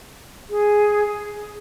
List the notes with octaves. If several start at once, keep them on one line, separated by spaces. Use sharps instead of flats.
G#4